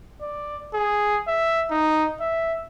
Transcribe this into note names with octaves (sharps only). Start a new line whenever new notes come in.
D5
G#4
E5
D#4
E5